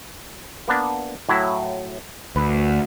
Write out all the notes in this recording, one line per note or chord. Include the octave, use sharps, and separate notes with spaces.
A#3 B3 D4
A2 F#3 E4
D2 B4